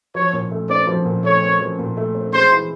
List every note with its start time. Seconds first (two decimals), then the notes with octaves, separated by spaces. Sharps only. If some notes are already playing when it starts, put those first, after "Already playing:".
0.15 F3 C#5
0.33 A#2
0.51 A3
0.69 C4 D5
0.87 F3
1.05 A#2
1.24 A3 C#5
1.42 C4
1.60 F3
1.79 A#2
1.97 A3
2.15 C4
2.33 G#3 C5
2.51 E3